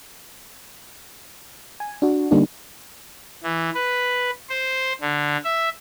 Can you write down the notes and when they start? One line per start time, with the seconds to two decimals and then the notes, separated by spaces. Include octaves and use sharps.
1.80 G#5
2.02 D4 F#4
2.31 D3 G3 A#3 D4 D#4
3.43 E3
3.75 B4
4.49 C5
5.01 D3
5.44 E5